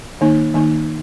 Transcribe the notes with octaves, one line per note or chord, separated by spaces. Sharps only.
D#3 A#3 D#4
D#3 A#3 D#4